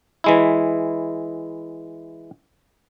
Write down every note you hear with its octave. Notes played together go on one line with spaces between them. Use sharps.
E3 G#3 E4